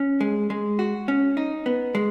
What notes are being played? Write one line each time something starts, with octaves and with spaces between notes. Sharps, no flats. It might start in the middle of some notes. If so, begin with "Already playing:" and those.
Already playing: C#4
G#3
G#3
F#4
C#4
D#4
B3
G#3